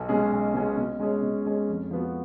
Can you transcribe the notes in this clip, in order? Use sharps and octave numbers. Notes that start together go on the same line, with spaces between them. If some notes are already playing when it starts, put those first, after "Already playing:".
Already playing: B1
B2 G#3 C#4 G#4
B1
B2 G#3 C#4 G#4
B2
G#3 C#4 G#4 C#5
B2
G#3 C#4 G#4 C#5
F2
F3 B3 F#4